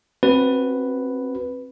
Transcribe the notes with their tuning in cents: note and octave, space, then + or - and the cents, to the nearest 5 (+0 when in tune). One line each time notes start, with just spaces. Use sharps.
C4 +25 F#4 +0 B4 +0